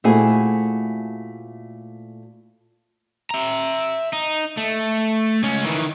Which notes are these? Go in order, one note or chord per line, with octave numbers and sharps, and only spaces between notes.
A#2 A3 C4 E4 F#4 G#4
E5 A#5
D#4
A3
C#2 C#4
D#3 E3